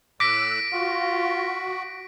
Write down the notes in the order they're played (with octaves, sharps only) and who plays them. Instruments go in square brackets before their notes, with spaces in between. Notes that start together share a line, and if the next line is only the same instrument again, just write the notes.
[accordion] A2 E6 F#6 [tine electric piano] D6 [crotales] A#6 B6 D7
[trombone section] F4 [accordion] F#4